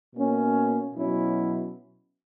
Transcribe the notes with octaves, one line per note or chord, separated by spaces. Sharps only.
B2 A#3 C#4
B2 F#3 C#4 E4